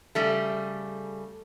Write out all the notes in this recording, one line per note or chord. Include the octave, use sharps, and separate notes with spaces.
C#3 G3 A3